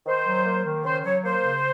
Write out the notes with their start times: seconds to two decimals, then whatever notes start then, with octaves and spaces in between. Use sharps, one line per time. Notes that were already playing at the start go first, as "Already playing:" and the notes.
0.06 D#3 C5
0.26 F#3
0.46 A#3
0.65 D#3
0.85 C#3 C5
1.04 F#3 C#5
1.24 A#3 C5
1.44 C#3